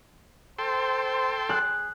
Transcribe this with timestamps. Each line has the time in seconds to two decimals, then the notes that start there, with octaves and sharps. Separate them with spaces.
0.59 A4 C5 G5 C6
1.49 G#4 F#6